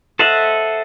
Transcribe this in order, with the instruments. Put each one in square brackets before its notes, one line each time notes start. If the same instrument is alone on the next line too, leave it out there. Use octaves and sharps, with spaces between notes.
[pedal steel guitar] A4 C5 D#5 E5 F#5